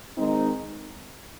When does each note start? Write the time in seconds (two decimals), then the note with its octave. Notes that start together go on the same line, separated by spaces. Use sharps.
0.17 D#3 G#3 C4 D#4